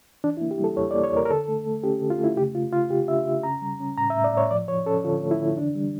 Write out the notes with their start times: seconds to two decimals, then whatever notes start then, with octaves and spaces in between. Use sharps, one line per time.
0.24 E3 D4
0.37 E4
0.41 A#3
0.51 G4
0.59 G3 A4
0.77 E2 C#5
0.91 D5
0.94 A#3
1.04 C#5
1.12 E2 A#4
1.25 A#4
1.30 D3 A4
1.48 A3
1.67 A3
1.83 C#4 G4
2.01 D3
2.10 F4
2.19 A3 E4
2.37 C#3 G4
2.55 C#3 F4
2.72 C#3 F4
2.90 C#3 G4
3.08 D4 E5
3.26 C#3
3.43 C#4 A#5
3.62 G3
3.80 C#4
3.97 A2 A#5
4.10 E5
4.15 A2
4.24 D5
4.33 A2 C#5
4.51 F3 D5
4.68 F3 C#5
4.86 C#4 A4
5.04 D3 F4
5.22 A3
5.31 E4
5.40 D3
5.57 E3 D4
5.76 G3